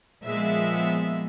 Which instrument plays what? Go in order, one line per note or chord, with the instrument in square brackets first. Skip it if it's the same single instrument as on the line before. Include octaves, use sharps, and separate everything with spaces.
[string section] A#2 F3 G#3 B3 E5